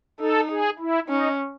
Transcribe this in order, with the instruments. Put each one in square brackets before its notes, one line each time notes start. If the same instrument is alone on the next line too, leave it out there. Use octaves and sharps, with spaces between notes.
[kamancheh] D#4 [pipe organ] A4
[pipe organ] G#4
E4
[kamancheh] C#4 [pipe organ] D#4